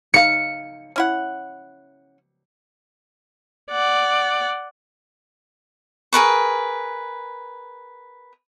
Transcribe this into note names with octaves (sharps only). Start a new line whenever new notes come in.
D#4 F5 C#7
C#4 E4 F#5
D5 F#5
G#4 A#4 B4 C#6